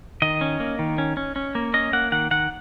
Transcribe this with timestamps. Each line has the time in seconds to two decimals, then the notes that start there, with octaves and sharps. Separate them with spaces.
0.22 D#3 D#5
0.41 C#4
0.60 A#3
0.79 D#3
0.98 C#4
1.17 C#4
1.36 C#4
1.55 A#3
1.74 C#4 D#5
1.93 A#3 F#5
2.12 D#3 F#5
2.31 D#3 F#5